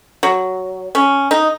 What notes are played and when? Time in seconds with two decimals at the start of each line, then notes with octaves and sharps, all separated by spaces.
0.23 F#3
0.95 C#4
1.31 D#4